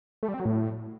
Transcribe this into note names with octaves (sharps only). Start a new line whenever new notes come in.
A3
G3
C4
F#3
A2